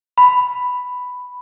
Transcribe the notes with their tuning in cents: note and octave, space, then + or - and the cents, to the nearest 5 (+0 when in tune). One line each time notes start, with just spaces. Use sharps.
B5 +5